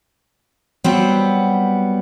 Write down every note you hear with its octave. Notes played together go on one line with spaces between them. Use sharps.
F#3 G3 B3 C4